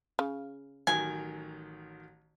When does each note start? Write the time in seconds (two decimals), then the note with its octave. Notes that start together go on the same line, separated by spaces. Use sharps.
0.19 C#3
0.87 A1 D#3 F#3 G#5